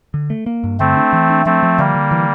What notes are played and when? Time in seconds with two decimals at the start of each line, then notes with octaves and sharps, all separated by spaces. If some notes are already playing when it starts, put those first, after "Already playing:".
0.14 D3
0.30 A3
0.46 A#3
0.64 G2
0.80 D3 A3 C4
0.97 D4
1.13 E3
1.30 D4
1.46 F3 A3 C4
1.63 F3
1.79 D3 G3 A#3
1.95 D3
2.11 E3